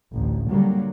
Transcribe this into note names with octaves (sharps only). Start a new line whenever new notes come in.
A1 D2
D3 F#3 G3 A#3